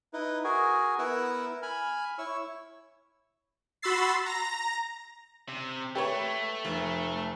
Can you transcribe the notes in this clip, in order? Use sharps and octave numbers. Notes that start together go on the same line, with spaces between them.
D#4 E4 B4
F#4 G#4 A#4 G#5
B3 E4 A#4 B4 F#5 E6
G#5 B5 F6
E4 C#5 C#6 E6
F#4 B5 C6 E6 A6 C7
A#5 A#6
C3
A3 G4 B4 C#5
F1